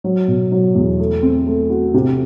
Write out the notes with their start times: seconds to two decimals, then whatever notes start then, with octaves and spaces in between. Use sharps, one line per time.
0.04 F#3
0.28 B2
0.52 F#3
0.75 E2
0.99 A3
1.22 C4
1.47 A3
1.70 F#4
1.94 C3